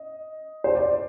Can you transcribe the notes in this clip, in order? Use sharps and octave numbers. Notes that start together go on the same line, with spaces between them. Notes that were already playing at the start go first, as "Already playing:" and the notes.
Already playing: D#5
C5
D5